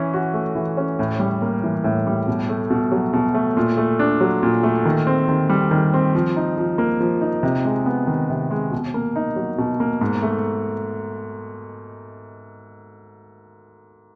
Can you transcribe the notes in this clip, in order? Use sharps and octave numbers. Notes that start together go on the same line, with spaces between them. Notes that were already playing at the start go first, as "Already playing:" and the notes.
Already playing: E3 C#4
F#4
A3
E3
C#4
A2
G3
A#3
E3
A2
G3
B2
A3
B2
F#3
B2
A3
A#2
A3
D4
F#3
A#2
A3
D#3
C4
D#3
G3
D#3
C4
F3
D#4
F3
A#3
F3
D#4
C3
G#3
B3
D#3
C3
G#3
B2
A#3
D#4
F#3
B2
A#3
G#2
A3